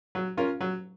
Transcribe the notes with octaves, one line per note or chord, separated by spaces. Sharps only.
F#3
C#4 F4 A#4
F#3